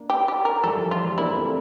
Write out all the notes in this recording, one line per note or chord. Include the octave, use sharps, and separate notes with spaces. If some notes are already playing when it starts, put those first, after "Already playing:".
Already playing: A#3 D4
G4
G4
A#4
E3 G3 A4
F3
F3 F4
E3 G3
A#3 D4 E4
A3 C4